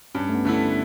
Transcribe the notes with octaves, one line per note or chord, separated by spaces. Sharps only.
G2 C#4
A3
B3
D3 A3 E4